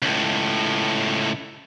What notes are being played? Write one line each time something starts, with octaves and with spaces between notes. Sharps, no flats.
C#2 A2